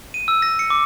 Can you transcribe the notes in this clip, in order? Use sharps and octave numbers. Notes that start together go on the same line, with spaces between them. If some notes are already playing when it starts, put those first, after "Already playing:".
D#7
E6
A#6
C#7
D6